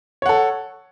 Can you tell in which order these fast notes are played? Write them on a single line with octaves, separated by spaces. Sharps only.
C#5 F#5 A4